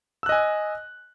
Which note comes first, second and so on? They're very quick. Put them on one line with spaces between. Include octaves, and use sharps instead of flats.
E6 F#6 D#5 G#5